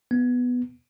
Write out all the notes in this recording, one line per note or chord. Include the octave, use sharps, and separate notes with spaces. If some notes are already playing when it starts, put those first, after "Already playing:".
B3